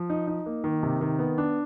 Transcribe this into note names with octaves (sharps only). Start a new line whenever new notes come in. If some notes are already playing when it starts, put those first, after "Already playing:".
Already playing: F3
D#4
D#4
A#3
D#3
C3
D#3
B3
D4